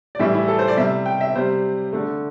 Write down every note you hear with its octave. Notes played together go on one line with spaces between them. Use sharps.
D5
A2 E3 G3 E5
E4
A4
C5
D5
C3 G3 E5
G5
E5
C3 G3 C5
D3 A3